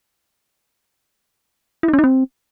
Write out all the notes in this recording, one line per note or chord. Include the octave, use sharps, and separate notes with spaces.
E4
D#4
C#4
D#4
C4